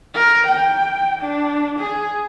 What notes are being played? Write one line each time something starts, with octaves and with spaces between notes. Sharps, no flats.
A#4
G5
D4
G#4